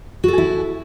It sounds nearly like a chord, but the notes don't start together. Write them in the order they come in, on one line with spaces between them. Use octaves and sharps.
F#4 A4 G#5 E4